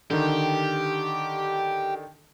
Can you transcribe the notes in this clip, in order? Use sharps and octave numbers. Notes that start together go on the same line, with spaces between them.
D3 D#3 G4